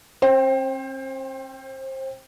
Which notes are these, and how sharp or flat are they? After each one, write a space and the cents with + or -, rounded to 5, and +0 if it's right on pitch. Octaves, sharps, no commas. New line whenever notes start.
C4 +45 C5 +25 G5 +0